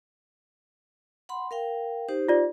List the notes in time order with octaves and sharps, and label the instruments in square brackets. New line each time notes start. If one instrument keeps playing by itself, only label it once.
[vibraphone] F#5 B5 C6
A#4 F5 G5
D#4 G4 C5
[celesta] F4 D5